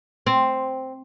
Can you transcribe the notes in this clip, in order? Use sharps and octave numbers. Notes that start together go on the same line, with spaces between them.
C4